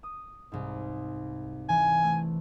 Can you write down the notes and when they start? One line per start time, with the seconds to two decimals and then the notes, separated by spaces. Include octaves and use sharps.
0.03 D#6
0.52 C2 G#2
1.69 E3 G#5
2.03 A3